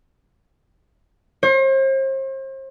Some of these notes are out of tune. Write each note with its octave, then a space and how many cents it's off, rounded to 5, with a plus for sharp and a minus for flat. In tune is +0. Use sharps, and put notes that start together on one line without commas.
C5 +40